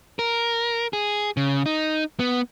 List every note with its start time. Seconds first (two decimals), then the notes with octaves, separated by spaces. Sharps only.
0.19 A#4
0.93 G#4
1.37 C#3
1.66 D#4
2.20 B3